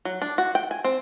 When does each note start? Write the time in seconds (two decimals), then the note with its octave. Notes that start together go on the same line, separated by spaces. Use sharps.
0.05 F#3
0.22 D4
0.38 F#4
0.55 G5
0.71 G#5
0.84 C4